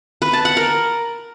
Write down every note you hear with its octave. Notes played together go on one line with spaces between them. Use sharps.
B4
A5
F#5
A#4